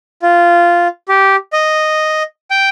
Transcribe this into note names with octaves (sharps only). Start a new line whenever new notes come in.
F4
G4
D#5
G5